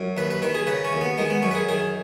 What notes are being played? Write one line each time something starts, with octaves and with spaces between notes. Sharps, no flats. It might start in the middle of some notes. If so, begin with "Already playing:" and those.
Already playing: F#2
D#2 B4
B4
D#3 B4
G#4
C#3 B4
C#4
D#2
B3
D#3 G#3
B3
F#2 C#4
B4
G#4
D#3 G#4